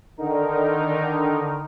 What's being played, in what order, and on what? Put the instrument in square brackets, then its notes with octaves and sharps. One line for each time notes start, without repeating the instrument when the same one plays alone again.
[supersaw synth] D3 D#3 D#4 A#4